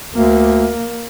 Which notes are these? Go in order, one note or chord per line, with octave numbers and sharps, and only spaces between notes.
D2 A#3